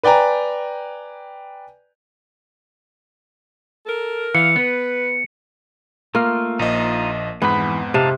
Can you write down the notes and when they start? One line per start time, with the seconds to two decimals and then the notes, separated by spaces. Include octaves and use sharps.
0.03 B4 D5 G5 G#5 A#5
3.86 A4 A#4
4.35 E3 F5 C#7
4.56 B3 B4
6.15 A3 A#3 F4 F6
6.59 A#1 F3 D#4 F4 D#5
7.42 F2 G#2 E3 B3 B5
7.94 C3 D#4 F5 A5